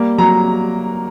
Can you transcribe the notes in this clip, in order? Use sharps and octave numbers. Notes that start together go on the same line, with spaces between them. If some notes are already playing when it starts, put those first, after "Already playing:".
Already playing: G3 A#3
F#3 A#5